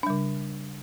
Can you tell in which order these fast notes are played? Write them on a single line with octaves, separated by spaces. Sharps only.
D4 G3 C#3